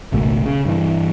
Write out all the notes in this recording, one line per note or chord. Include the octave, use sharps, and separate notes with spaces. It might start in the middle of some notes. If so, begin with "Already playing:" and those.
G#1 C#2 B2 A3
C#3
G2 E3